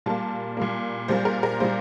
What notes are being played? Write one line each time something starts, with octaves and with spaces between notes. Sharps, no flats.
A#2 G3 A#3 A5
A#2 G3 A#3
A#2 G3 A#3 C5
A#4
A#4
A#2 G3 A#3 C5